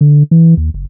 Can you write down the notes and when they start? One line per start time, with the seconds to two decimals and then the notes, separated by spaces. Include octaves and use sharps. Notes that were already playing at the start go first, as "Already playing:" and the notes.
0.01 D3
0.31 E3
0.57 D#2
0.74 F#1